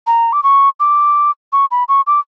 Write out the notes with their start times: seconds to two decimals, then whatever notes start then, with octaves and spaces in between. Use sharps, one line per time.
0.07 A#5
0.33 D6
0.43 C#6
0.80 D6
1.53 C#6
1.71 B5
1.89 C#6
2.07 D6